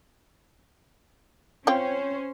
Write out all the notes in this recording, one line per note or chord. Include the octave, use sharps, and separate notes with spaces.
C4 C#4 F4 C5 C#5 G5